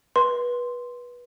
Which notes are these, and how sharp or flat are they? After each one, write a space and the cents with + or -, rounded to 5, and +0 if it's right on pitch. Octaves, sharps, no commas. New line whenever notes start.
B4 -20 C6 +0